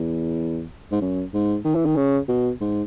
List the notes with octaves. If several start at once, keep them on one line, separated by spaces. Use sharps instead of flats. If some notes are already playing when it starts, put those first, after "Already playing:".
Already playing: E2
G#2
F#2
G#2
D#3
E3
D#3
C#3
B2
G#2